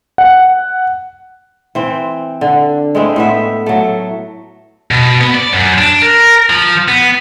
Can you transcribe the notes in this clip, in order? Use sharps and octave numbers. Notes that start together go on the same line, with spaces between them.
F#5
E3 C4
D3
G#3 A3 C4 E4
A2 B3 E5
F#3 A3
B2
B3
D5
F#2
D4
A#4
F3
B3